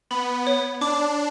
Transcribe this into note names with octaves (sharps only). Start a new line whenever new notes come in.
B3 B5
C#5
D4 D6